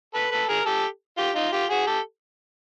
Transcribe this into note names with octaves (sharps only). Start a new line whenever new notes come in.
A4 B4
A4 B4
G#4 A#4
G4 A4
F4 G4
D#4 F4
F4 G4
F#4 G#4
G4 A4